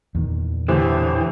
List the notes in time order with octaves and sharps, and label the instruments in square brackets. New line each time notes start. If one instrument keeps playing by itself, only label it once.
[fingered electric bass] E2 A#2 D#3
[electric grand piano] A2 G4 C5 [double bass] D3 [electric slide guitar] E3